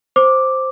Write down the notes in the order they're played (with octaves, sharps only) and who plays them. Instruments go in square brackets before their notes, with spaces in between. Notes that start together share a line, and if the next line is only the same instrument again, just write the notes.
[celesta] C5 D6